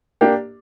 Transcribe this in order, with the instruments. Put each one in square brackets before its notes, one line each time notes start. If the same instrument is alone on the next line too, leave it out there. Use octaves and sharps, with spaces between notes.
[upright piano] A#3 D4 G4